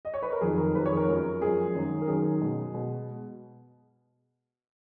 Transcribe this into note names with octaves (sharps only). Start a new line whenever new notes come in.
D#5
C#5
B4
A#4
F2 D#3 F#3 G#4
A#4
F2 D#3 F#3 B4
C#5
G#4
A#4
F#2 F3 G#3 A#4
F#2 F3 G#3 G#4
F#2 D#3 F#3
A#4
F#2 D#3 F#3 G#4
B2 G#3
B2 G#3